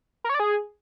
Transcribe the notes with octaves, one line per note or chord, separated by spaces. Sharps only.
A#4
C#5
D5
G#4